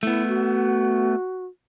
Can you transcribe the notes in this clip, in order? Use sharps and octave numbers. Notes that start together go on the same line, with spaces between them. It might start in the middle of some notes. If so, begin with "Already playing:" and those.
A3 B3 E4
F#4